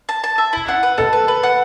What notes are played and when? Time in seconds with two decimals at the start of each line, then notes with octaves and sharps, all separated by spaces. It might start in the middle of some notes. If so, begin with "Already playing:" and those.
0.09 A5
0.24 A5
0.38 E5
0.53 E4
0.68 F#5
0.83 B4
0.98 A4 A5
1.13 B4
1.28 B4
1.43 F#5